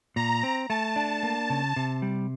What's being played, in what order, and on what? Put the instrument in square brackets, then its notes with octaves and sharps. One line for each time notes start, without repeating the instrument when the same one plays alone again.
[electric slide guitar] A#2 [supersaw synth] A#5
[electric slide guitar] C4
[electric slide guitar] A3 [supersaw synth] A5
[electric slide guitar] D4
A#3
C#3
C3
G3